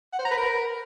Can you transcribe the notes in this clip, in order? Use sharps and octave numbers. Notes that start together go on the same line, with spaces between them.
F#5
C5
A#5
B4
A#4